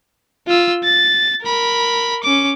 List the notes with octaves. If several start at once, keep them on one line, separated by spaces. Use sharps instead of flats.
F4 E6
A6
A#4 B5
C#4 D6